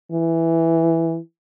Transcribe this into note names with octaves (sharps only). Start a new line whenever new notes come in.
E3